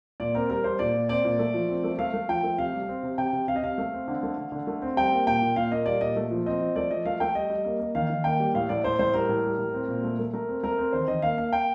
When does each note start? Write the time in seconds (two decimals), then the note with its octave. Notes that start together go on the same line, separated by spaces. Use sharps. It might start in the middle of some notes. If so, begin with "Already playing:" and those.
0.20 A#2 D5
0.35 C4 A#4
0.50 G3 A#4
0.64 G3 C5
0.79 A#2 D5
0.94 A#2
1.09 C4 D5
1.25 A#2
1.39 A3
1.54 F3
1.69 C4
1.84 A3
1.99 A3 F5
2.14 A3
2.28 F3 G5
2.43 A3
2.58 C3 F5
2.73 G3
2.88 C4
3.03 C3
3.18 C3 G5
3.33 C3
3.48 C3 F5
3.56 D#5
3.63 C3 F5
3.78 A3
3.93 C4
4.08 D3
4.23 A3
4.37 D3
4.52 D3
4.67 A3
4.82 C4
4.96 G3 G5
5.12 A#3
5.27 A#2 G5
5.42 A#2
5.56 A#2 F5
5.72 A#3 D#5
5.86 G3 D5
6.01 A#2 D#5
6.16 A3
6.31 F3
6.46 C4 D#5
6.61 F3
6.76 A3 D5
6.91 F3 D#5
7.05 A3 F5
7.20 A3 G5
7.35 G3 D#5
7.50 G3
7.65 A#3
7.80 A#3
7.95 D#3 F5
8.10 D#3
8.24 A#3 G5
8.40 G3
8.54 A2 F5
8.69 A2 D5
8.84 A2 C5
8.99 A2 C5
9.14 G3 A#4
9.29 A2
9.44 G3
9.59 A2
9.74 C4
9.89 A#2
10.04 A3
10.19 A3
10.33 A3 A#4
10.48 C4
10.63 A3 A#4
10.78 C4
10.93 D#3 C5
11.08 D#3 D#5
11.22 A#3 F5
11.37 A#3 F5
11.52 A#3 G5